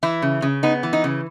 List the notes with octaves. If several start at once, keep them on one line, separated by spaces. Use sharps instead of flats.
E3 E4
C#3
C#3
B3 D#4
E3
D#4
C#3